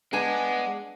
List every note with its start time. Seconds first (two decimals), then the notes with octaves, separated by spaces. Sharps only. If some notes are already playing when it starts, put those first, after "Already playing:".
0.13 G#3 B3 D4 F#5 G#5